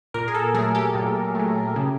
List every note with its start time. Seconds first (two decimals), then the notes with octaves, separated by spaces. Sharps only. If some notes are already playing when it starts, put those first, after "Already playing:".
0.14 A#2 A#4
0.28 G#4
0.34 A4
0.54 F#3 A3 G#4
0.75 G4
0.95 A#2
1.35 F#3 A3
1.76 C#3